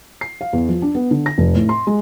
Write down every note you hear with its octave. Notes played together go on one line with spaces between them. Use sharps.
C7
F5
E2
F3
D4
B3
D3
A#6
F1
A2
C6
G#3